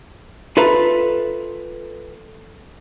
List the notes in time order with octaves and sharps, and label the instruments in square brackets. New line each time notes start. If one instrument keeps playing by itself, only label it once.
[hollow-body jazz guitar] F4 A4 B4 E5 A#5